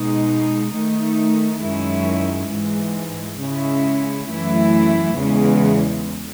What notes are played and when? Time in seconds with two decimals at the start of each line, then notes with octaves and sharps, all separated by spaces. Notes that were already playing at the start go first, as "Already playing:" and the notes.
Already playing: B2 G#3 D#4
0.73 D#3 A3 D#4
1.62 F#2 D#3 G#3 C#4 E4
2.51 G#2 E3 G#3
3.40 C#3 G#3 C#4 E4
4.28 F#2 E3 A3 E4
5.17 E2 C#3 E3 G#3